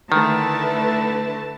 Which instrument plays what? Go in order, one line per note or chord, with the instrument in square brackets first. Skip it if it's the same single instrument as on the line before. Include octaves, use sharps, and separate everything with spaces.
[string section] D3 A3 E4 [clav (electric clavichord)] D#3 [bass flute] B4 [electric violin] A5